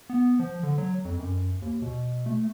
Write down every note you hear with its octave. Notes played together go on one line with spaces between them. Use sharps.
B3
F3
D3
F#3
F2
F#2
D#2
B2
A3